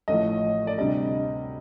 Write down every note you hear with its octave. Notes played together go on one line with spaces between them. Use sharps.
A1 A2 F3 D#5
D5
D2 C3 G3 D#5